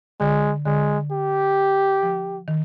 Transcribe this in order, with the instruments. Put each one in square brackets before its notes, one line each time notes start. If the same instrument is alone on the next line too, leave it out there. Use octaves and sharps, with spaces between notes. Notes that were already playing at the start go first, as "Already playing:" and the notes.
[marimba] D3 [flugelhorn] G#3
[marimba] D3 [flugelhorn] G#3
[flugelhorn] G4
[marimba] F3
D#3